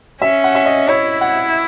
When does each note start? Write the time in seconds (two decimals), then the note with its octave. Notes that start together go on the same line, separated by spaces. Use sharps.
0.22 C#4 E5
0.44 F#5
0.55 E5
0.66 D#5
0.88 E4 C#5
1.21 F#5